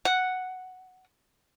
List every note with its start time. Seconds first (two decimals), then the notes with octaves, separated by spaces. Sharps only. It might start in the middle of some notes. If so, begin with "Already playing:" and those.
0.05 F#5